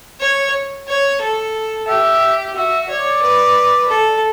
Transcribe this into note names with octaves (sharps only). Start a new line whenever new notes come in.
C#5
C#5
A4
G4 E5
F#4 E5
C#5 D5
B4
A4